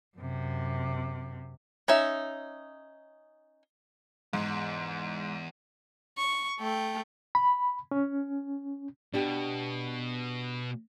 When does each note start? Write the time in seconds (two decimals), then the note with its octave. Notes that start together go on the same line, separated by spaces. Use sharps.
0.18 F#2 C3
1.88 C#4 D#4 E5
4.33 E2 G#2
6.18 C#6
6.60 A3 G5
7.35 B5
7.91 C#4
9.14 B2 D4 G4